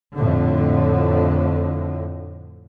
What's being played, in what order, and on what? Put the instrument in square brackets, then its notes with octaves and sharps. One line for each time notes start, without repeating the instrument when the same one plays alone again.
[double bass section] F2 A2 D3